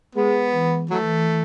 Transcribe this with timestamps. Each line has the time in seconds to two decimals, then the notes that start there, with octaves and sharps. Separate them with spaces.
0.15 G#3 B3
0.52 E3
0.90 E3 F#3 A3